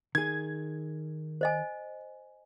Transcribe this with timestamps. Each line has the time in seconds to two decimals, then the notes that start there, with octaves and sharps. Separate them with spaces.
0.15 D#3 G#4 G#6
1.41 C5 D#5 G#5